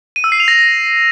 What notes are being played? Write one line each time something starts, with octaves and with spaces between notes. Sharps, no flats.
D#7
E6
C7
F7
A#6